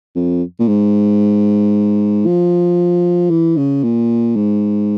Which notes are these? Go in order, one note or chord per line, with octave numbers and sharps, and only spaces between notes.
F2
A#2
G#2
F3
E3
C#3
A#2
G#2